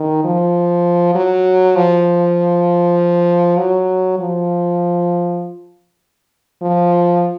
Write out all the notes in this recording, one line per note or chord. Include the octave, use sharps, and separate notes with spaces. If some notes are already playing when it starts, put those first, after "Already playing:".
Already playing: D#3
F3
F#3
F3
F#3
F3
F3